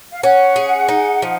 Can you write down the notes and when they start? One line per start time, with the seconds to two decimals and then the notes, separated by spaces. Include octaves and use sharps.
0.11 F5
0.23 C#4 F#5
0.56 G#4
0.89 D#4
1.22 F3